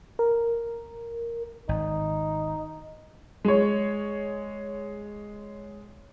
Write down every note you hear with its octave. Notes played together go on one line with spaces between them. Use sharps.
A#4
G#1 D#4
G#3 C#5